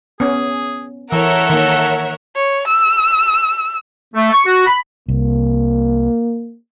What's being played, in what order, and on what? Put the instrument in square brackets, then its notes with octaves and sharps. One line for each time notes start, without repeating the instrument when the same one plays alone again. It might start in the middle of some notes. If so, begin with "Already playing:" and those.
[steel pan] B3 C#4 [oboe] G#4
[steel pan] E3 [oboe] A4 [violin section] A#4 C#5 E5 [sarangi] F#5
[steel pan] D#3 A#3
[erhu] C#5
E6
[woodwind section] A3
C#6
F#4
B5
[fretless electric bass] C2 [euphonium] A#3